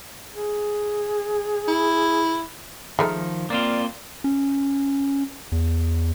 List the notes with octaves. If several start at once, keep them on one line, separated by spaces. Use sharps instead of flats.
G#4
E4
D#3 F3 G#3 A3 D#4 F6
A#3 C4 F4 D5
C#4
E2